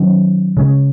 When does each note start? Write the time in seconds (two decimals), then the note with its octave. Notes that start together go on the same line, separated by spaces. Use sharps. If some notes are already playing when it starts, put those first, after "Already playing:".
Already playing: D#3 F#3 C#4
0.57 C#3 G#3 C#4